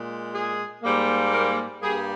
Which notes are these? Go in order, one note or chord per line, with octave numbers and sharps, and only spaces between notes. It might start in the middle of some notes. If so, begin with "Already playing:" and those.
Already playing: A#2 G#3
G#4
G#2 G3 A#3
A#4
G2 G3 A#3 G#4